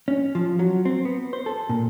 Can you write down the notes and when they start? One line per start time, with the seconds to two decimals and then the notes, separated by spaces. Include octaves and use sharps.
0.08 C#4
0.35 F3
0.59 F#3
0.85 C4
1.05 B3
1.33 C5
1.46 A4
1.69 A#2